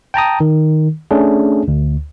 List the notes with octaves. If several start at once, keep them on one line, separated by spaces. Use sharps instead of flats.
G5 A5 A#5 D#6
D#3
A3 C#4 D4 G#4
D2